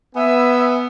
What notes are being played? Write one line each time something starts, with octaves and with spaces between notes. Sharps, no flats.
B3 E5 G#5 E6